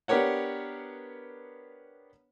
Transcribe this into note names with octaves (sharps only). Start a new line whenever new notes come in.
B3 D4 G4 A#4 C#5 F#5